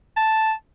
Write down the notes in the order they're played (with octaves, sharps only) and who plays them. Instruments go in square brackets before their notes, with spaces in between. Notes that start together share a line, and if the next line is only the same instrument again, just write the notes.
[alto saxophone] A5